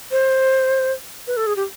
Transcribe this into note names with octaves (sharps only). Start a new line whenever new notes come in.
C5
B4
A4
G#4
G4